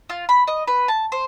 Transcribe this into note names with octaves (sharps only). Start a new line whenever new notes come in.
F4
B5
D#5
B4
A5
C5